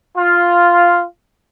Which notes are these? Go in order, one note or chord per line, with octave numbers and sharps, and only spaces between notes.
F4